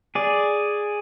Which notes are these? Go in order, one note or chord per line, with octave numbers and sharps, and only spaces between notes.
G#4 D5